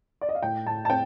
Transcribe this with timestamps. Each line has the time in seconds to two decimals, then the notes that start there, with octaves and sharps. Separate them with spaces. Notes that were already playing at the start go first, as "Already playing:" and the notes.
0.21 D5
0.29 D#5
0.35 F5
0.42 A2 G5
0.66 A2 A5
0.85 A5
0.90 C4 G5